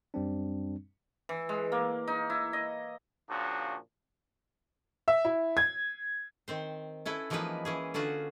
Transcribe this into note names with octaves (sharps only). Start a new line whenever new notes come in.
F#2 G3 C4 D4
E3
G#3
A#3
D#4
E4
D#5
A#2 C#3 F3 D4 F#4
E5
E4
G#6
D#3 C4 C5
C#4 E4 A4 B4
E3 F3 G#3 A#3 D#4 B4
E3 C#4 G#4
D3 C#4 F4 F#4 G#4